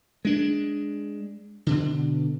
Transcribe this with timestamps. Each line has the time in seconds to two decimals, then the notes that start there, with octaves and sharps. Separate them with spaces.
0.25 G#3 D4
1.67 B2 D3